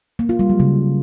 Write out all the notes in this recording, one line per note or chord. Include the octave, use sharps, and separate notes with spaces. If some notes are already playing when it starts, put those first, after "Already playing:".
A#3
F4
G3
F#3
C#3